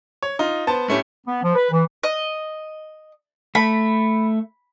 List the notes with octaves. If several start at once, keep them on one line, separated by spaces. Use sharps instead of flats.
C#5
D#4 F4
B3 C5 A5
A2 A3 C#4 G4
B3
F3
B4
E3
D#5
A3 B5